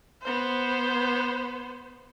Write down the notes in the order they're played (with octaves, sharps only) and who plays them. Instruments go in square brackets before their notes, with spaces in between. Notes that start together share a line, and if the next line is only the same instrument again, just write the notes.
[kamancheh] B3 C5